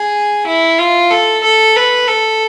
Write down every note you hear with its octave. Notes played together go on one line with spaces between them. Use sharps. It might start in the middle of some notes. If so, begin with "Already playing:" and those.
Already playing: G#4
E4
F4
A4
A4
B4
A4